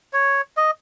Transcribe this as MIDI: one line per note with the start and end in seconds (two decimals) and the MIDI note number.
0.13 0.41 73
0.57 0.71 75